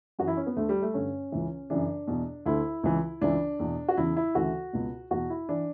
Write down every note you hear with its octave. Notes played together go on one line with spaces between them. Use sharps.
F#2 E3 F#4
E4
C#4
B3
D2 D3 A3
G3
A3
G2 D3 C#4
C#2 C#3 E3
F#2 C#3 E3 D4
E2 B2
D2 D3 E4
C#2 C#3 E3
C#2 C#3 E3 D4
E2 B2
F#4
E2 C#3 E3 E4
E4
D2 C#3 E3 F#4
C#2 B2
E2 B2 F#4
E4
E3 D4